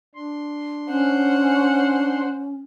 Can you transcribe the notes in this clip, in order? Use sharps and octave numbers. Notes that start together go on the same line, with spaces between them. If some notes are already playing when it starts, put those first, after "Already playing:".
D4 C6
C#4 C5 F#5